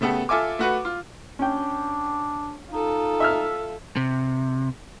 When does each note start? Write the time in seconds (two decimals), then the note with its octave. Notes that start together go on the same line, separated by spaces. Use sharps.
0.01 C#3 A3 B3 G4 A4
0.29 F4 A4 E5 G#5 D6
0.59 A3 F#4 B4
0.85 F4
1.39 C#4 D4 G5
2.71 D#4 F4 A4
3.20 E5 E6 F6
3.97 C3